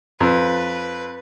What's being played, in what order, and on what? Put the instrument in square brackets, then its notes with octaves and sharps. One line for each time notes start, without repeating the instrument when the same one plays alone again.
[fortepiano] F2 [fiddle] B4